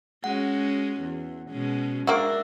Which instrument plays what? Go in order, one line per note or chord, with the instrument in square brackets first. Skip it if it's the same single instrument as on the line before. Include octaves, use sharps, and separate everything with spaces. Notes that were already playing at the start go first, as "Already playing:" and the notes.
[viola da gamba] G#3 C#4 F#4 [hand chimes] F#5
[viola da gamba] E2
B2 G#3 C#4
[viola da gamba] G#2 D4 [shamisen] A#3 F#4 [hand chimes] E5 E6